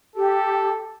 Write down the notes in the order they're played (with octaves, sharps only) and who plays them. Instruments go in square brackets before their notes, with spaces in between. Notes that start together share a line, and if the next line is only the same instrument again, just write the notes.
[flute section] G4 [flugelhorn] A4